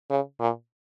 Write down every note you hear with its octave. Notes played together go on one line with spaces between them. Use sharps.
C#3
A#2